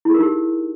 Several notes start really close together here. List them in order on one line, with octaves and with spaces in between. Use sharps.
E4 G#4 A#4 D#4 G4